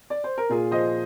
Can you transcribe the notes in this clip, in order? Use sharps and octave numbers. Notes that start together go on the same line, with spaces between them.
D5
C5
A#4
A#2 F4 G#4
F3 C5 D#5